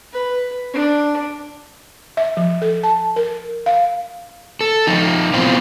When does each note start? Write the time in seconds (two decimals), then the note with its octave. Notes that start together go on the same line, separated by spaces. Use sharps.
0.13 B4
0.73 D4
2.17 E5
2.37 F3
2.62 A4
2.83 A5
3.16 A#4
3.66 F5
4.61 A4
4.87 F3 D#4
5.34 B2 E3 C4 F4